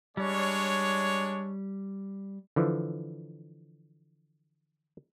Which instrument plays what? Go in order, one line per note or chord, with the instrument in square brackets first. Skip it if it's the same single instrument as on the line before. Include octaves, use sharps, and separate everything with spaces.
[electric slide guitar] G3 [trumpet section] G#3 D4 C#5
[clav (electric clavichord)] D3 E3 F3